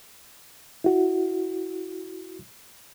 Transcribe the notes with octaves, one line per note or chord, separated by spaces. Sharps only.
E4 F#4